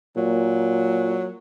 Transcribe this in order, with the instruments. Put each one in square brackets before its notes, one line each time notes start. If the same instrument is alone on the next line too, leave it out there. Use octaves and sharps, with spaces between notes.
[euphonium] A#2 [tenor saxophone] F#3